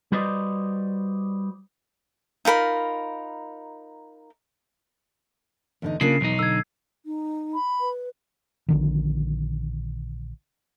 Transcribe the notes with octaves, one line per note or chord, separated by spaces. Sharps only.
G3 F#4 B4 C5 D5 D#5
D#4 F4 A#4 B5
E2 D3 D#4
C#3 A#3 D4 F4 C7
B1 E2 D#4
D3 E6 G#6
D#4
B5
B4
A#1 D3 D#3